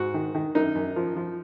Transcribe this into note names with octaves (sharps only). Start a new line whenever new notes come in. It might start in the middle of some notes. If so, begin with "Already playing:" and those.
Already playing: G#2 F#4
D#3
D#3
F#2 D#4
F#2
F3
F3